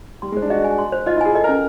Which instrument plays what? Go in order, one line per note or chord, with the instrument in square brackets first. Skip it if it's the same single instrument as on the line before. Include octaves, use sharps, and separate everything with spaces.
[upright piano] G3 [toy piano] C6
[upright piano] G#3
[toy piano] C5
[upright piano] D4
[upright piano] F#4 [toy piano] D#5
[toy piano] G#5
C6
C5
[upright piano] F4 [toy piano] D#5
[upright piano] E4
[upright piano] G#4 [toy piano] G#5
[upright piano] A4 [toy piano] D#5
[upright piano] A#4
[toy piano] C#4